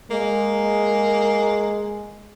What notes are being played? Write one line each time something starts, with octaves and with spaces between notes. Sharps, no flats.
G#3 A#3